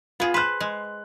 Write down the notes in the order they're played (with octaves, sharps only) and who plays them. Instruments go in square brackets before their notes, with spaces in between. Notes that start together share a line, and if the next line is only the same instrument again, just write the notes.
[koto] B3 G#4 [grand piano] F4
[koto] B4 C5 [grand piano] C6 F#6
[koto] G#3